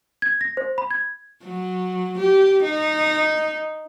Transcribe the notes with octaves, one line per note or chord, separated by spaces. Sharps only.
G#6
A#6
C5
B5
G#6
F#3
G4
D#4